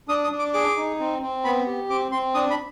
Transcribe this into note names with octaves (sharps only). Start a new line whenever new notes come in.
D4 D#6
D#6
D4
D6
G#4 D6
D#4
C4
C4
B3 B5
G4
C4 D6
C4 C6
D4 D#6
B5